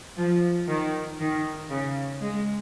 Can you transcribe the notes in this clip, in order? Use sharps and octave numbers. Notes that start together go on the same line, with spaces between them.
F3
D#3
D#3
C#3
G#3